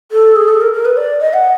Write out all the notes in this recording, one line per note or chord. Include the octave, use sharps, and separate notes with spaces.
A4
G#4
A4
A#4
A#4
B4
D5
D#5
F#5